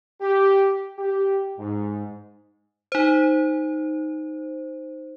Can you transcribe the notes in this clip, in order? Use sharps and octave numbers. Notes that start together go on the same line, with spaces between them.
G4
G4
G#2
D#4 C5